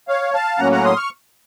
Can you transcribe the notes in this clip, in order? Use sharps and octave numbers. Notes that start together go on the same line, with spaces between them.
C#5 F5
F5 A5
A2 F#3 A#3 C#4 F#5 A#5
F#5 A#5
C6 D#6
C#6 F6